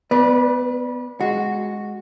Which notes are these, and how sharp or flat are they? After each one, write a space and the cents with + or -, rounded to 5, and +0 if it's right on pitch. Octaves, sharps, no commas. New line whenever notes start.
B3 +20 B4 -30 D5 +5
G#3 +0 F#4 +0